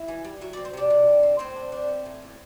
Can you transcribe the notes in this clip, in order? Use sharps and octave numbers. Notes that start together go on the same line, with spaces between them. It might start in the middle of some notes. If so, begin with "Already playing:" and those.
Already playing: E4 E5
E3
G3
F#3 E5
C4 D5
C5
C3 D4 D5
C3
C4
C4
A2 C4 C5
D4
D4
B3
A2
A2